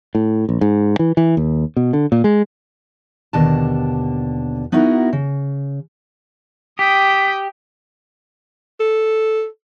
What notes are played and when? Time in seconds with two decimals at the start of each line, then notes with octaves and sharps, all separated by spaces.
0.15 A2
0.49 A#1
0.61 G#2
0.99 E3
1.17 E3
1.37 D#2
1.77 B2
1.93 D3
2.12 A#2
2.24 G#3
3.33 D#2 B2 D3 D4 A5
4.72 B3 D#4 E4 F#4 A#4
5.13 C#3
6.79 G4 G5 D#6 B6
8.80 A4